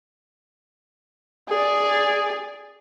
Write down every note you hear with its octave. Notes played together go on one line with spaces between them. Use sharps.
G#4 D5